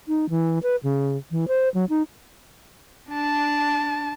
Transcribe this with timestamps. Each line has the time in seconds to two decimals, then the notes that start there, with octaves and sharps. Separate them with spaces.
0.08 D#4
0.30 E3
0.63 B4
0.83 C#3
1.31 E3
1.48 C5
1.74 F#3
1.89 D#4
3.10 D4 A5